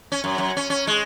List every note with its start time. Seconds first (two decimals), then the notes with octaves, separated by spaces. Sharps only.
0.12 C#4
0.24 F#2
0.38 F#2
0.57 C#4
0.70 C#4
0.87 G#3